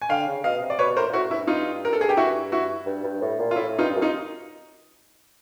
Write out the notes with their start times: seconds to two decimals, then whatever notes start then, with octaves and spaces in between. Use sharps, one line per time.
0.02 G#5
0.09 D3 F5 G5
0.27 C#3
0.44 B2 D#5 F5
0.61 C3
0.70 D5
0.79 B2 B4 C#5
0.97 A2 A#4 C5
1.09 A#2
1.13 A2 E4 F#4
1.31 G2 E4
1.47 D#4 F4
1.85 A#4
1.93 A4
2.01 G#4
2.09 G4
2.17 E4 F#4
2.52 E4 F#4
2.86 G2
3.04 G2
3.21 A2
3.39 A#2
3.51 F4
3.56 A2 E4
3.79 G2 D#4 F4
3.95 F#2
4.02 D#4 F4